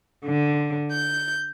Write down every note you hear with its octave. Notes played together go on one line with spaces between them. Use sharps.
D3
G6